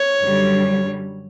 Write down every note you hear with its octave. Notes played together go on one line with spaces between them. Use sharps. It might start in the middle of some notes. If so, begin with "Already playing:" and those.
Already playing: C#5
F#2 D3 G3